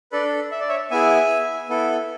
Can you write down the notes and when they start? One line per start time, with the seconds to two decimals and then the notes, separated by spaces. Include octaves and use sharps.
0.12 D4 A4 B4 D5
0.51 E5
0.60 D5
0.69 C#5 E5
0.91 B3 E4 G#4 E5 G#5
1.69 B3 E4 A4